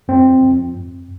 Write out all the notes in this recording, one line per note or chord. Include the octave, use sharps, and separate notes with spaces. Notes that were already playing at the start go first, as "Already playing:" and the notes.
F2 C4
F2
F2